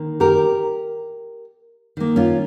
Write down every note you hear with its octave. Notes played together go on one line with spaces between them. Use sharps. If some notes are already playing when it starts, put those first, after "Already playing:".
Already playing: D#3 A#3
G4 A#4
D#3 A#3
C#4 F4